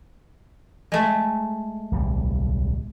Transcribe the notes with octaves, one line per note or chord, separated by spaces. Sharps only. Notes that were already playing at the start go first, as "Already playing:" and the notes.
G#3 A3
D1 B1 G3